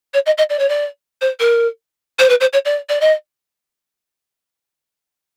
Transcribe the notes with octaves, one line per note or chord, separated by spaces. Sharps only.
C#5
D#5
D#5
D5
C#5
D5
C5
A#4
C5
B4
C5
C#5
D5
D5
D#5